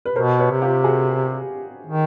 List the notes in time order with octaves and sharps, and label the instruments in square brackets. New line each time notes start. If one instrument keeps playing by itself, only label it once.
[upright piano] B4
[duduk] B2 [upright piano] A#4 C5
[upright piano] B4 C#5
[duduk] C3
[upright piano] F4 G4
F#4 G#4
[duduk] D#3